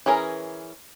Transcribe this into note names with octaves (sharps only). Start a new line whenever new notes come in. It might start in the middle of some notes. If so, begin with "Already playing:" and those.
E3 C#4 G#4 A#4 A#5